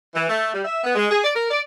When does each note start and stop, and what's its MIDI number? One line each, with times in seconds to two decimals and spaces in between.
0.14 0.26 52
0.30 0.48 57
0.53 0.64 55
0.65 0.84 76
0.84 0.95 59
0.95 1.05 56
1.10 1.18 68
1.23 1.31 74
1.35 1.49 70
1.50 1.61 74